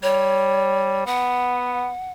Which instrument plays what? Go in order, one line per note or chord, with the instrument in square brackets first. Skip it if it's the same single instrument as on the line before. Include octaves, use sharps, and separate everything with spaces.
[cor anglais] G3 [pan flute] C#5
[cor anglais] B3 [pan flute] F#5